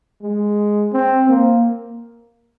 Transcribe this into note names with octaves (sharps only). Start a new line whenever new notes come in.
G#3
C4
A#3